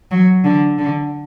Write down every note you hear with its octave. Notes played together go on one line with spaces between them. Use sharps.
F#3
D3
D3